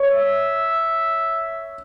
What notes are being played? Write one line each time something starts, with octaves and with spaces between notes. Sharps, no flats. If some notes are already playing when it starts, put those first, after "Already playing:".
Already playing: C#5
E5